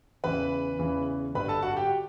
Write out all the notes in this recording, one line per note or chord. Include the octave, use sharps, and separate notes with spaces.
E2 C#3 E3 B4 B5
E2 C#3 E3
G2 D3 B4 B5
A4 A5
F#4 F#5
G4 G5